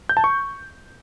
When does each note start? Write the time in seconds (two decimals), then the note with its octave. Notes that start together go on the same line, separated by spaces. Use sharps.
0.09 G6
0.17 A5
0.24 C#6